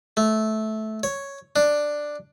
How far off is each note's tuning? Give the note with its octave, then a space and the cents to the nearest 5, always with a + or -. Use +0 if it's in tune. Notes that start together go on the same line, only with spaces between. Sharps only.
A3 -15
C#5 +0
D4 +5